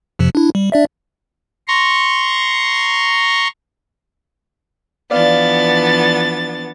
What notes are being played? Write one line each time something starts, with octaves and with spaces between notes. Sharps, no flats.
F2 C3 F3
D4 E4
G3
D4 D5 E5
A#5 C6 C#6
E3 F3 B3 D4 D5 F5 A6